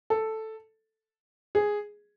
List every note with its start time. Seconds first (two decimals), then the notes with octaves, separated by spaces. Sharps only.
0.10 A4
1.55 G#4